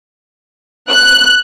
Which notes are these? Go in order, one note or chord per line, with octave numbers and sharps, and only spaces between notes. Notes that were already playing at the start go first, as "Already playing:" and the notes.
F#6